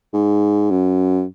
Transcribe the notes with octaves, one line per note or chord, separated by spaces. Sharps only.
G#2
F#2